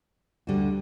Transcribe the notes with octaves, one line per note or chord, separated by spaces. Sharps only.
D2 D3 G3 D4 F#4